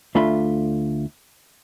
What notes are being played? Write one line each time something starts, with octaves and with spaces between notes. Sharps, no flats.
D2 A3 D4 F4 E5 B5